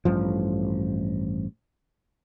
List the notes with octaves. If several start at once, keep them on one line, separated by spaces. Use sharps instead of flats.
A1 G2 F3